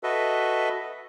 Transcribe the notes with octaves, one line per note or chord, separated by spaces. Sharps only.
F#4 A4 B4 D#5 E5